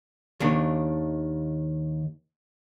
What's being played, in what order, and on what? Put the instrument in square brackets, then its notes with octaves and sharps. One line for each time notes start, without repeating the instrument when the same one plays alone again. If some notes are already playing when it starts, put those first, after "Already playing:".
[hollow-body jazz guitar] D#2 D#3 D4